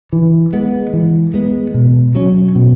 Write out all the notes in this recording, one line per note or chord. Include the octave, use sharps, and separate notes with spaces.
E3
G#3 B3
E3
G#3 B3
B2
F#3 C#4
B2